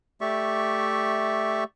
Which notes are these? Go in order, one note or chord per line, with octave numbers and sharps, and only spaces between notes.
A3 G4 D5 E5 C#6